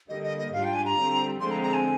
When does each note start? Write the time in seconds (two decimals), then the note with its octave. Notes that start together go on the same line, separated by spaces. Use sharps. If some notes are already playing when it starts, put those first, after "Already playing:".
0.09 D3 G3 A#3 D#5
0.23 D#5
0.38 D#5
0.52 G#2 G3 D4 F4 F5
0.64 G5
0.74 G#5
0.85 A#5
0.96 D3 G3 C4
1.40 D3 F3 G#3 C4 C6
1.51 A#5
1.63 A#5
1.74 G#5